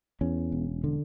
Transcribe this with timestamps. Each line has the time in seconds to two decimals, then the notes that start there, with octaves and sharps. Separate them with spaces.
0.21 E2 C#4
0.52 E1
0.84 D3